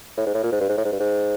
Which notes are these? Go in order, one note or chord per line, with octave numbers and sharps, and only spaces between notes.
A2
G#2
A2
A#2
G#2
G2
G#2
A2
G#2
G2
G#2